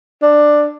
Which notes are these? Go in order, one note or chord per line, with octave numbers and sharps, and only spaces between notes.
D4